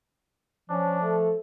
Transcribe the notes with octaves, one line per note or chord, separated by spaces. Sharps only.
F3 C#4 D4
A3 A4